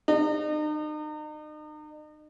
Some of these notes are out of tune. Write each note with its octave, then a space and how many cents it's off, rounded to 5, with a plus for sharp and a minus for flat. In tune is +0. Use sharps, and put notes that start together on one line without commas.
D#4 -40